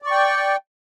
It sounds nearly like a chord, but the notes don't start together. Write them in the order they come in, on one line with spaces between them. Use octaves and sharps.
D5 C#6 G5